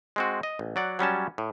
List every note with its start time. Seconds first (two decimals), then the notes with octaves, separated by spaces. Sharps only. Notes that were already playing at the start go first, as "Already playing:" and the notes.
0.16 G#3 C4 F#4
0.43 D#5
0.59 A1
0.76 F#3 D5 F#5
0.99 F#3 G3 C#4 A5
1.38 A2